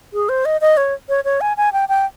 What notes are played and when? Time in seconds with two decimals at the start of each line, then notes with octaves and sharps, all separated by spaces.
0.13 G#4
0.29 C5
0.45 D#5
0.61 D#5
0.77 C#5
1.09 C#5
1.25 C#5
1.41 G#5
1.57 G#5
1.73 G5
1.89 G5